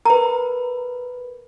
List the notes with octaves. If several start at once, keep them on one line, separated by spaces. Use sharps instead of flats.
A#4 B4 A#5